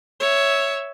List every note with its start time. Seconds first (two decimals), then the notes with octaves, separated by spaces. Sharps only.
0.20 C#5 E5